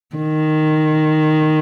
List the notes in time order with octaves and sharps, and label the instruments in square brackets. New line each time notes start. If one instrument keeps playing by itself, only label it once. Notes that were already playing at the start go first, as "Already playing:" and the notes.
[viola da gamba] D#3